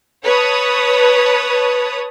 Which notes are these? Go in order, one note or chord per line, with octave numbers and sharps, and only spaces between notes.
B4 C#5 A5 D#6